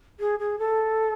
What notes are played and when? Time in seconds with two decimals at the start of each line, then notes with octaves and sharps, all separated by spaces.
0.19 G#4
0.39 G#4
0.58 A4